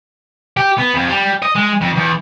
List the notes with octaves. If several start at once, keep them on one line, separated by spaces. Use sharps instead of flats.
G4
B3
F2
G3
D#5
G#3
F2
E2